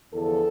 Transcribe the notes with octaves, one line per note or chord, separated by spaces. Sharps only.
E2 D3 F3 A4